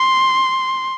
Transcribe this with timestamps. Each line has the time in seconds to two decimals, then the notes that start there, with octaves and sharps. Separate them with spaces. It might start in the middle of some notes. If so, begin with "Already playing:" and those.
Already playing: C6